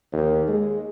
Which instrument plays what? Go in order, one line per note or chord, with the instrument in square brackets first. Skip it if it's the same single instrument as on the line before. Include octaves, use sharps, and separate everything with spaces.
[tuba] D#2
G#3